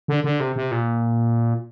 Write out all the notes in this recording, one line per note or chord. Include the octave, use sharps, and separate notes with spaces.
D3
D3
C3
C3
A#2